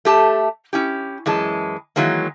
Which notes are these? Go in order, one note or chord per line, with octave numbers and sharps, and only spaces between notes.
A3 G4 A5
C#4 E4 G4
F#2 E3 G#3 A5
D#3 E3 F#3 G#3 A#3